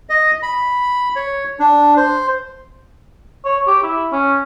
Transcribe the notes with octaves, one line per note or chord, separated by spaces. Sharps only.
D#5
B5
C#5
D4
C5
C#5
G4
E4
C#4